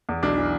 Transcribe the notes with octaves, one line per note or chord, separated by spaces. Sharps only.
E2
B1 D4
E3